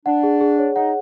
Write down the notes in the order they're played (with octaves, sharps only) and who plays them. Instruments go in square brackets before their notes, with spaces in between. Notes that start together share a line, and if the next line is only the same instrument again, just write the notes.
[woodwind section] D4 [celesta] F#5
[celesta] G#4
G#4
C#5
[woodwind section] D#4 [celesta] F#5